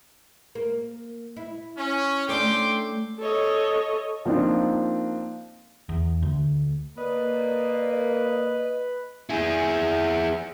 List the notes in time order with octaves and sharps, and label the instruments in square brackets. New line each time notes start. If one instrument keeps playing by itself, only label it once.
[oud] A#3
E4
[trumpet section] C#4
[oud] A3 C#4 D4 [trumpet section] G5 C6 D6
[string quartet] A4 C#5 D#5
[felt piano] F3 A#3 C4 D4 D#4 F4
[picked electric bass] E2
D2
[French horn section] A#3 [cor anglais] B4 [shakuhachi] D5 [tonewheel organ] D#5
[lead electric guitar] E4 G#4